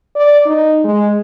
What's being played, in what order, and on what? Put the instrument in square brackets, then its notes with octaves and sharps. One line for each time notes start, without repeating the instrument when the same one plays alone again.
[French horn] D5
D#4
G#3